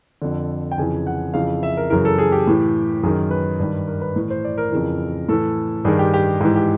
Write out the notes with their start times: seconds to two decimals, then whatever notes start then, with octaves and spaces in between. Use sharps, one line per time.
0.22 F2 D3
0.71 G5
0.78 F2 C#3 E3 G#5
1.07 F#5
1.34 F2 C#3 E3 F5
1.63 E5
1.77 A#4
1.90 F#2 C#3 E3 A#4
2.05 A4
2.18 G#4
2.32 G4
2.47 A2 E3
3.03 F#2 D#3 G#4
3.31 B4
3.60 G2 D#3
3.88 A#4
4.01 B4
4.16 A2 E3
4.30 C5
4.45 D5
4.58 A#4
4.72 F2 C#3 E3
5.29 A2 E3 A4
5.85 G2 D#3 G#4
5.99 G4
6.14 G4
6.41 G#2 E3 G4
6.56 G4